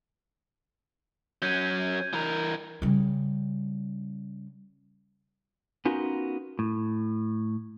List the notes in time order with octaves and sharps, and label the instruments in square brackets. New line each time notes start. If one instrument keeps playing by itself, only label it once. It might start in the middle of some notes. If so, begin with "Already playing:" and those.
[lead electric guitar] F#3 C#4 [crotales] G6 G#6 D#7
[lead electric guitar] E3 A#4
[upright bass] C#3 G3
[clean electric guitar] B3 C#4 D#4 F4 F#4 A#4
A2